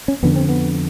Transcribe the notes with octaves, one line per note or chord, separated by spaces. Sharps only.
C#4
F2 D3 B3
C4
B3